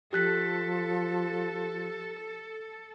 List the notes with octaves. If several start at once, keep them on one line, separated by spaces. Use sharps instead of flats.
F3 G4 A4 F#6 B6